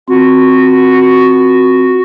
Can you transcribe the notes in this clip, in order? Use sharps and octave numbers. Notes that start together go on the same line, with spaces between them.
C4 F4 F#4